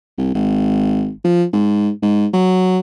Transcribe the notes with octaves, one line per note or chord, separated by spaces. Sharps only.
C2
G#1
F3
G#2
G#2
F#3